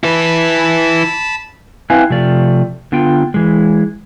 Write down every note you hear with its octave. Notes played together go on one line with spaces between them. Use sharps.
E4 B4 A5 B5
C4 E4 B4 F5 G#5
C3 F3 A3 D5
D3 B3 F4 G5
E3 G#3